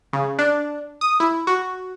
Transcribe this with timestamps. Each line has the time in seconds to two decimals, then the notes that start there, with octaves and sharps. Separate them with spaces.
0.13 C#3
0.39 D4
1.01 D#6
1.20 E4
1.47 F#4